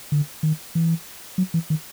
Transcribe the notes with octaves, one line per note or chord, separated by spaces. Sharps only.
D3
D#3
E3
F#3
E3
D#3